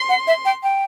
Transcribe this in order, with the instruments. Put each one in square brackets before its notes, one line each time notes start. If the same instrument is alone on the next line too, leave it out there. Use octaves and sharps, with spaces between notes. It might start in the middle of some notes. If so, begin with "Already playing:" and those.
Already playing: [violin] C6
[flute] F#5
E5
G5
G5